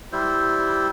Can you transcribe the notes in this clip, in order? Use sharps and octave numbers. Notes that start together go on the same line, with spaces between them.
G3 E4 C5